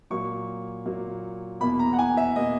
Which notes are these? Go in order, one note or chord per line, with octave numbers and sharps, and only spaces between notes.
A#2 F#3 A#3 C#6
A#2 F#3 A#3
E2 B2 A#3 B5
A#5
F#5
G#5
E5
B2 A#3 D#5